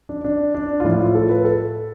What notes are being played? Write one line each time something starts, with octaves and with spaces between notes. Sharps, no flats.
D4
D4
D4
F4
A2 F3 E4
F4
A4
B4
A4